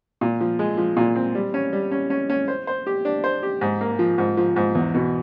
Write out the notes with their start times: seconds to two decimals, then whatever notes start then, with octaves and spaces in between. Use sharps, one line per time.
0.21 A#2
0.41 F3
0.59 G#3
0.78 F3
0.97 A#2
1.16 C4
1.35 G3
1.54 C#4
1.73 G3
1.91 C#4
2.10 C#4
2.30 C#4
2.48 C5
2.67 C5
2.87 G4
3.05 D4
3.24 C5
3.43 G4
3.61 G#2
3.81 A#3
3.99 F3
4.18 G#2
4.37 F3
4.56 G#2
4.75 E2
4.94 B2